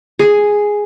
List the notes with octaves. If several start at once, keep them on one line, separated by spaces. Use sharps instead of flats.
G#4